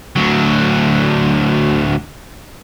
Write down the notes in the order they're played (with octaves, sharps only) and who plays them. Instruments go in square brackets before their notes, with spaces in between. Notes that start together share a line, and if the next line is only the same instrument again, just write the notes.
[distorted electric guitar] D2 F#3